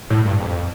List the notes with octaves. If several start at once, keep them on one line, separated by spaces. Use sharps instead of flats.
A2
G2
F2